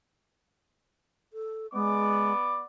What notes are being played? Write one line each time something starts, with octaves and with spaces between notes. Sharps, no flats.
A4
G#3 B3 D5 D6